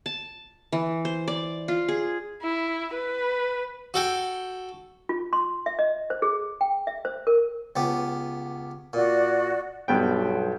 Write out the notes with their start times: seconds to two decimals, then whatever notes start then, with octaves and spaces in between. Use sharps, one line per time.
0.06 A5
0.72 E3
1.05 C5
1.28 D5
1.68 F4
1.88 G#4
2.42 E4
2.94 B4
3.94 F#4 A4 G5
5.09 F4
5.33 C6
5.66 E5
5.79 D#5
6.10 C5
6.22 G#4
6.61 G5
6.87 E5
7.05 C5
7.27 A#4
7.76 C#2 B3 G4
8.93 A#2 F#4 D5
9.88 B1 G2 B3 G5